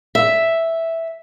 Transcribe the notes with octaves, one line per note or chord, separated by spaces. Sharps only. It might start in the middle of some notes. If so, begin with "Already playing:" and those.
E5